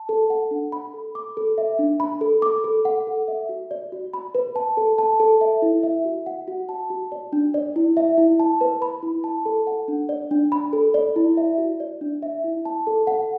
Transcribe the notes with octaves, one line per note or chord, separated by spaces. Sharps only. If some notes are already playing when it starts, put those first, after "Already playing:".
Already playing: A5
A4
F#5
D4
B5
A4
D6
A4
E5
D4
B5
A4
D6
A4
F#5
A4
E5
F#4
D5
F#4
B5
B4
A5
A4
A5
A4
E5
E4
E5
F#4
F#5
F#4
A5
F#4
D5
D4
D5
E4
E5
E4
A5
B4
B5
E4
A5
A4
F#5
D4
D5
D4
B5
A4
D5
E4
E5
F#4
D5
D4
E5
E4
A5
A4
F#5